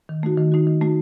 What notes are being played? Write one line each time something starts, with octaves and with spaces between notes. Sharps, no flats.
D#3
A3 D#4 F#4
D#3
A3 D#4 F#4
D#3
A3 D#4 F#4